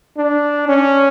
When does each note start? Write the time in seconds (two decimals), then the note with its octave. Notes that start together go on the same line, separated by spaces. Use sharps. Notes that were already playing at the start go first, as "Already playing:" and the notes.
0.18 D4
0.69 C#4